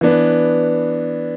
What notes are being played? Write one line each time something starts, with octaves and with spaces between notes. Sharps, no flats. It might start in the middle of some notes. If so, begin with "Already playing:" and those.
E3 B3 D4